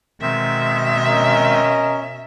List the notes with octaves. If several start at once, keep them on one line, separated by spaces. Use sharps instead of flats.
B2 D#3 G#3 C4 E5
C#4 A#4 D#5